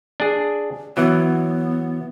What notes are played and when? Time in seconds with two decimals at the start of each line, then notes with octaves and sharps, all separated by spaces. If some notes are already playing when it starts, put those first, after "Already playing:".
0.20 D4 G#4
0.97 E3 F#3 B3